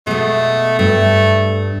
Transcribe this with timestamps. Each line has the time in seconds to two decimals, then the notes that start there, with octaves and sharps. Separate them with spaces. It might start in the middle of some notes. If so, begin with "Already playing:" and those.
0.07 B2 G#3 A3
0.79 G2 A3